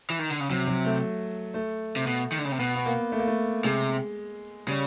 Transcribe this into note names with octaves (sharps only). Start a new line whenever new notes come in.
E3
D#3
D3
C#3
C3 F#3
F#3
A3
A3
C3
B2
D#3
D3
C#3
C3
B2 B3
B3
A#3
A3
A#3
A3
C3 G#3
C#3 G3